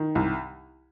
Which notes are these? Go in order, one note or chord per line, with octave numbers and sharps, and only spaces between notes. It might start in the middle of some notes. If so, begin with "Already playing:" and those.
Already playing: D#3
C2